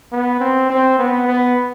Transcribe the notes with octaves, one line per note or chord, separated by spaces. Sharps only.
B3
C4
C4
B3
B3